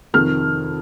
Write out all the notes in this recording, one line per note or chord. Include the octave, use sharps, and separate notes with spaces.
F2 C3 D#3 F6